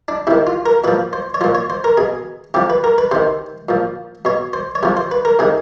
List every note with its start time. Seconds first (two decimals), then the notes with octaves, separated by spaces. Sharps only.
0.08 D4
0.27 C3 E4
0.31 D#3
0.47 F4
0.66 A#4
0.84 A#2 F3 B4
1.13 C5
1.34 C#5
1.41 F3 C5
1.44 A#2
1.55 C#5
1.70 C5
1.84 A#4
1.97 B2 G#4
2.54 C3 F3 G4
2.70 B4
2.84 A#4
2.98 B4
3.11 C3 D#3 C5
3.69 A#2 F3
4.25 B2 C#5
4.53 C5
4.75 C#5
4.83 C3 F3 C5
4.97 C5
5.11 B4
5.25 A#4
5.39 C3 D#3 G#4